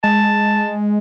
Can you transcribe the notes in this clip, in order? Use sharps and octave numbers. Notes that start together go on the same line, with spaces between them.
G#3 A5